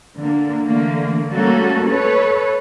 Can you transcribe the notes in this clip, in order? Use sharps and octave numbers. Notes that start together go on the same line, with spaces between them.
D3 A#3
D3 E3 A3 A#3
G3 A3 A#3 C#4 F#4 A4
A4 B4 C#5